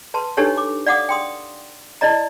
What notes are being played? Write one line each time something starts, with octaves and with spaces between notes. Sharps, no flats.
B4 A5 C6
D4 D#4 G4 A4 B4 C#5
D6
D5 F5 F#5 D6 D#6
G5 C6 D#6
E4 D5 D#5 A#5